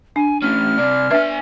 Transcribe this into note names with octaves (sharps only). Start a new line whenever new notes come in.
D4 G#5
A2 C#4 F6
C3 D5
D4 B4 E5 G#5